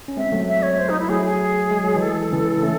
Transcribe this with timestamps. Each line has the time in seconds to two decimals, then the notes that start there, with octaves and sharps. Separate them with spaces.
0.08 C#4
0.17 G#3 C4 E5
0.32 F#3 A3
0.48 E5
0.62 C#5
0.79 C5
0.89 D#4
1.00 E4
1.09 F#3 A3 G#4
1.25 G#4
1.71 G#3
1.83 F#3
1.96 E3 G#3
2.02 A4
2.32 C#3 E3
2.63 A3 C#4